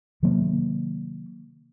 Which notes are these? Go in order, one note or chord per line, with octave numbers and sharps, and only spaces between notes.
C3 D#3 F#3 A#3